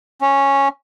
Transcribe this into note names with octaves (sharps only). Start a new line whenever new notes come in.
C#4